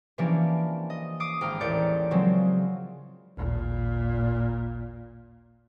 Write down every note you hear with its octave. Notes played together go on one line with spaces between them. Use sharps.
C3 E3 F3 A#3 C#4 D4
D#5
D6 D#6 C7 D7
G#1 G5 A#5 F6
A1 D#2 D5 G6 C#7
C#3 F3 F#3 G#3 C4
A1 D#2 A#2